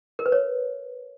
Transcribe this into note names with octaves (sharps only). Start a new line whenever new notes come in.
A#4
B4
C#5